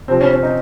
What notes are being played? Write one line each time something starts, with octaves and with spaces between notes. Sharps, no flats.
C3 F3 C4
C#4
C#4
D#4